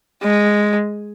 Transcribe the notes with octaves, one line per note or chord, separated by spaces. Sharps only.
G#3